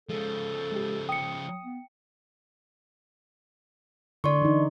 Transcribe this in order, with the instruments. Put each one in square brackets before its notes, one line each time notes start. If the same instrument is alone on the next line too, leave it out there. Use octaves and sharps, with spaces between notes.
[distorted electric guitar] C#3 F3 [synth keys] G#3 [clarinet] A4
[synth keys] G#3 G4
[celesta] G5 C#7 [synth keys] D#6
[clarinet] B3
[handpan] D3 [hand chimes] D5 C6 C#6
[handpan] E3 D#4